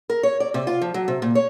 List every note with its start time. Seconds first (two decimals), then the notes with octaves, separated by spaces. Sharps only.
0.10 A#4
0.23 C#5
0.40 D5
0.54 C3
0.67 F4
0.81 F3
0.94 F#3
1.08 C3
1.22 A#2
1.35 C#5